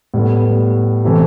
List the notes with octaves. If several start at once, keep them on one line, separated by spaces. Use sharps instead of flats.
A2 G3 B3
C3 E3 A3